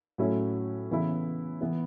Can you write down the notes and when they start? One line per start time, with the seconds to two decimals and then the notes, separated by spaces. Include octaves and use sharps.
0.18 A2 F#3 C#4 E4
0.90 C#3 E3 B3 E4
1.61 E3 B3 E4